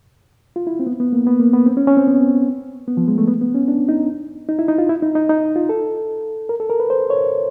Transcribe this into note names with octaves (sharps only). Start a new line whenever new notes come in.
F4
E4
C4
B3
B3
A#3
B3
A#3
B3
C4
C#4
C#4
C4
B3
B3
F3
G#3
A3
B3
B3
C#4
D4
D#4
D#4
E4
D#4
F4
E4
D#4
D#4
D#4
F4
A4
A#4
A4
A#4
B4
C5
C#5